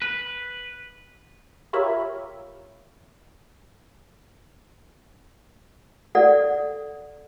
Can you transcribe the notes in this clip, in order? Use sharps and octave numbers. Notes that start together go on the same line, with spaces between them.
B4
F4 G4 A#4 C#5 E5 B5
A4 D5 F#5